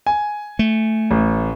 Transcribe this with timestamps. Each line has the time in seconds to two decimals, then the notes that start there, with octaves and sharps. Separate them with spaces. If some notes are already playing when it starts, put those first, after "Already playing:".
0.07 G#5
0.59 A3
1.11 A1